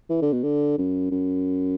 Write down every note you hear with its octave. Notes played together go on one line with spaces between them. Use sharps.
E3
D3
B2
D3
F#2
F#2